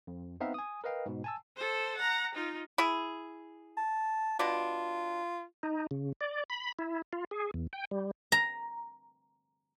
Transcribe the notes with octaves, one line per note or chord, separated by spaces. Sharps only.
F2
B3 C4 D#4 B4 E5 F5
G#5 D#6
A#4 B4 D#5 F5 G5
G#2 B2
G#5 A5 E6
A4 C5
F#5 A#5
D#4 F4
E4 G#4
A5
B2 D4 F4
D#4
C#3
D5
B5
E4
F4
G#4
E2
G5
G3
A#5